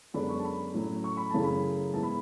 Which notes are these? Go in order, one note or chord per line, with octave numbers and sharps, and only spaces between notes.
F#2 D3 G#3 B3 D4 B5
C#6
A5
B5
A2 F#3 C#4
C#6
B5
F#2 C#3 E3 A3 C#4 A5
B5
G#2 E3 B3 E4 A5
B5